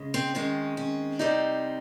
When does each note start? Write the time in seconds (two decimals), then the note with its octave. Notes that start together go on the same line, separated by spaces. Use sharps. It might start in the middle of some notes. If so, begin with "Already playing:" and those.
Already playing: C#3 G#3
0.14 C4
0.35 D#3 G#3 C4 C#4
0.77 C#4
1.19 C3 G3 C4 D#4